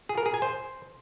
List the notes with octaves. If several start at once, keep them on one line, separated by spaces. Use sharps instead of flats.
G#4
A#4
G#4
G#5
C5